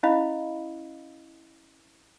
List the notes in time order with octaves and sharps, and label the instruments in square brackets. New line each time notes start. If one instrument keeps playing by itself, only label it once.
[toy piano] C#4 E4 D#5 F5 B5